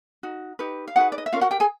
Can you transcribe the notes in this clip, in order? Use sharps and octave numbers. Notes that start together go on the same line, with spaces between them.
D#4 F#4
D#4 G4 B4
F5
D#4 F#4 G#4 B4 F#5
D5
D#5
E5
C#4 F4 A#4 F5
F#4 F#5
G4 G5
G#4 G#5